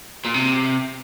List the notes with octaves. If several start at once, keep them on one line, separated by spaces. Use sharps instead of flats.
A#2
C3